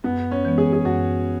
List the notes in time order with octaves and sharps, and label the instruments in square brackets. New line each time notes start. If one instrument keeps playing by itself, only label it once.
[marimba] F#2 [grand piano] B3
[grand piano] C#4
[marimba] E3 G#3 B3
[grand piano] G#4
G#4
[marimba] F#2 [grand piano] F#4